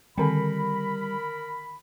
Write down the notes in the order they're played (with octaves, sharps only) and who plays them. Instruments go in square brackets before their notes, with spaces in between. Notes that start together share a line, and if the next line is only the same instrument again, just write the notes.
[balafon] D3 D#3 C4 [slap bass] G3 [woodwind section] A#4 B5